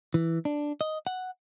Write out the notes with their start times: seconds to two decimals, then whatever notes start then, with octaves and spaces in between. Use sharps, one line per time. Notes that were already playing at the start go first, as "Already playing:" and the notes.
0.14 E3
0.45 D4
0.81 D#5
1.07 F#5